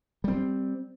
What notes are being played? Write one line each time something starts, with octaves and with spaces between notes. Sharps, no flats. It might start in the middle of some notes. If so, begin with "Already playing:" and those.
G3 C4